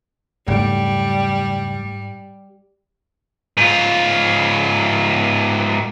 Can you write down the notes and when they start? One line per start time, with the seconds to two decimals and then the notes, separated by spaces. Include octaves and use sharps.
0.48 F#1 E2 G#2 G3 A3
3.57 G#2 F4